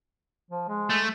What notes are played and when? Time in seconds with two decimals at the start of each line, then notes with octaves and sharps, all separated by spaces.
0.51 F3
0.68 G#3
0.90 A3